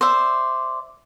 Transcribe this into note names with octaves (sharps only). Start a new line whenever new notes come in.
C5 D5 E5